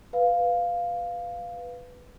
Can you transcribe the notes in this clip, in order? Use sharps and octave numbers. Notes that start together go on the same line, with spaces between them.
B4 F5